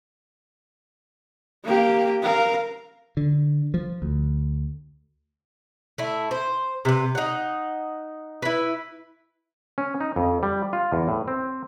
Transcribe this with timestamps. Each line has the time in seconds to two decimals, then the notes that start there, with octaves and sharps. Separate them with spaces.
1.64 A#3 G4
2.23 A#4 F5
3.17 D3
3.74 F3
4.02 D2
5.98 A3 E4
6.31 C5
6.85 C3 B4
7.15 D#4 F#5
8.42 E4 B4
9.78 C#4
10.01 D#4
10.16 F2
10.43 G3
10.73 F4
10.92 E2
11.08 A2
11.28 C4